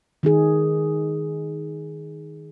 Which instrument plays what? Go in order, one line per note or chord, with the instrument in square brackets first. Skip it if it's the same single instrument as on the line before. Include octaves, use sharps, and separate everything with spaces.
[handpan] D#3 D#4 G#4